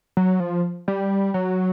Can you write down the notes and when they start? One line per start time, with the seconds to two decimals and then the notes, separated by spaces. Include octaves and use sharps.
0.17 F#3
0.40 F3
0.88 G3
1.34 F#3